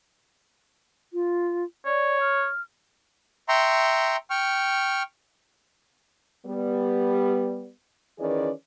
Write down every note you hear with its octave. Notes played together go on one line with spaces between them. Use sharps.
F4
C#5 D5
F6
E5 G5 A#5 C6 C#6
G5 C#6 F6
G3 B3 G4
D#3 E3 C#4 G#4 B4 D5